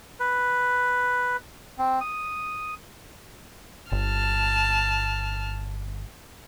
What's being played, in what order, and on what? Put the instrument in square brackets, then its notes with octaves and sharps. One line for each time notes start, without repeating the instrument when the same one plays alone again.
[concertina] B4
C4
D#6
[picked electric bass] G1 [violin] A5 F6